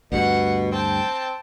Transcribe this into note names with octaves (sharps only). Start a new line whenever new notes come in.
D2 G2 B2 F#5
C4 G5 A5